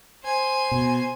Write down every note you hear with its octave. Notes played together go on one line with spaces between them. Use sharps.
C5 G#5
B2